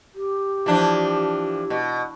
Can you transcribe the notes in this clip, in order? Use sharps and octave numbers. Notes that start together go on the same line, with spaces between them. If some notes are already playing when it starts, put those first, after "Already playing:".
G4
E3 F3 D4
B2